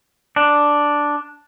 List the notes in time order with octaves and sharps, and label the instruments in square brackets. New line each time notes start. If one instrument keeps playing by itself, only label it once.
[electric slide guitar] D4